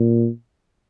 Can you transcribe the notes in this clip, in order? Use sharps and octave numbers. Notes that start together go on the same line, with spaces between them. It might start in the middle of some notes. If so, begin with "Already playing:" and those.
Already playing: A#2